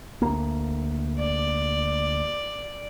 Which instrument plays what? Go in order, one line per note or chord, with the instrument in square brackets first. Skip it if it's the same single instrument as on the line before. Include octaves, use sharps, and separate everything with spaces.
[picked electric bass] D2 A#3
[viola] D5